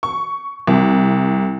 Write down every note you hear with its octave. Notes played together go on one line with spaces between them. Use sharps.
C#6
C2